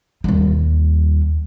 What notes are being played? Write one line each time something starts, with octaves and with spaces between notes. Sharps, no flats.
D#2 G3